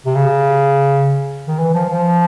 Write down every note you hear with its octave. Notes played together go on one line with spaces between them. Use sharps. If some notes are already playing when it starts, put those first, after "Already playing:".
C3
C#3
D#3
E3
F3
F3